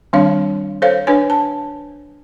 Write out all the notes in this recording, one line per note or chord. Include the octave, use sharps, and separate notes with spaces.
D#3 G3 C4 D4 C#5 F5
A4 C5 C#5 F5
D4 B4 C#5 G#5
A5